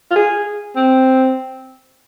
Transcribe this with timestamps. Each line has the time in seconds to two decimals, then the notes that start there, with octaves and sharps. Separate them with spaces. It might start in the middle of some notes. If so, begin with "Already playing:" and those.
0.11 F4
0.16 G#4
0.76 C4